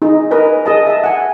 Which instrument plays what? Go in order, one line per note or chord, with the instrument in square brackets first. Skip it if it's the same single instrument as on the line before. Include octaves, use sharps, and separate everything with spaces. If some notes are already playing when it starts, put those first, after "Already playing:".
[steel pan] D#4 G#4
A#4 B4 D#5 G#5
G#4 D#5 A5
E5 A5
F#5 G#5